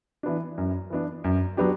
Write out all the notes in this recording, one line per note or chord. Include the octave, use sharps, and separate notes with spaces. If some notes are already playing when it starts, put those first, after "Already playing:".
E3 B3 D4
F#2
E3 B3 D4
F#2
F#3 B3 D4 G4